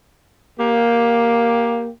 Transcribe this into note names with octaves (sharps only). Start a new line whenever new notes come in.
A#3 G4